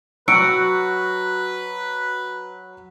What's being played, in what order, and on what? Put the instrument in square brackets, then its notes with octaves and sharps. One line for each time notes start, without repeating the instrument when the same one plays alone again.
[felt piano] F#3 F6 [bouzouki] F#4 [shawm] B4 [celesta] E6 C#7 D7